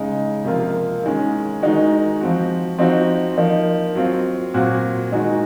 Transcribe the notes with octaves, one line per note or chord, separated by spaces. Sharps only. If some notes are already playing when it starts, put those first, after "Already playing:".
Already playing: C#3 G#3 D#4
C3 F3 A#3 F4
D#3 G#3 C#4
D#3 G#3 D#4 F#4
F3 C4 F#4
F3 C4 D#4 F#4
F3 A#3 D#4
F#3 C4 F4
A#2 F#3 C4 F#4
D#3 G#3 D#4 F#4